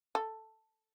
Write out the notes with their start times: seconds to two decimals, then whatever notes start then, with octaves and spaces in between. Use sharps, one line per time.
0.15 A4